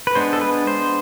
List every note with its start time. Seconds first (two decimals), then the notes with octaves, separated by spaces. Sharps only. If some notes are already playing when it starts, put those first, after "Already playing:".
0.07 B4
0.15 G#3 B3 D4 C5
0.33 A4
0.41 B4
0.67 C5